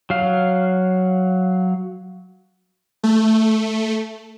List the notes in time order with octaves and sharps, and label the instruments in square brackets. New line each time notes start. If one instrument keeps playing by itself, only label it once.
[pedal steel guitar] F#3 F5
[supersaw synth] A3